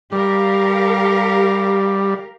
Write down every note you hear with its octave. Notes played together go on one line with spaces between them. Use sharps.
G3 G4 A#4 F5